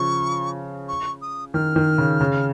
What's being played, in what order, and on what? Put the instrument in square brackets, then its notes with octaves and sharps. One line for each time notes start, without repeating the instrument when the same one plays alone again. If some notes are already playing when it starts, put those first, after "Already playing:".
Already playing: [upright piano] C#3 F3 [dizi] C#6
[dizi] C#6
D#6
[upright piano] D#3 [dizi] F6
[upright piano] D#3
C#3
C#3